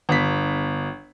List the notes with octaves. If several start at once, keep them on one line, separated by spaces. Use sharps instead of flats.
G1 B6